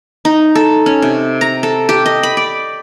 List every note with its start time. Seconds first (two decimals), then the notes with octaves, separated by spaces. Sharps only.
0.25 D#4
0.55 A4
0.86 C#4
1.02 C3
1.41 A#5
1.63 A4
1.89 G4
2.06 D#5
2.23 B5
2.37 D5